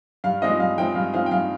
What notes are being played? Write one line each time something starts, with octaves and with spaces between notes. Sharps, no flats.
G2 F5
F3 G#3 C4 D#5
G2 F5
F3 G#3 C4 G5
G2 F5
F3 G#3 C4 F5
G5
G2 F5